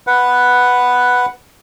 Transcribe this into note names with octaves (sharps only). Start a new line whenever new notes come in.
B4 F#5